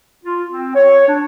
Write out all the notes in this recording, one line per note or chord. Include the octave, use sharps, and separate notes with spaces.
F4
C4
C#5
D4